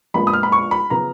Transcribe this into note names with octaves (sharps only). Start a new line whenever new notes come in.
A#1 A#2 G#3 B3 B5
D#6
F6
B5
C#6
B5
C#3 F3 B3 A#5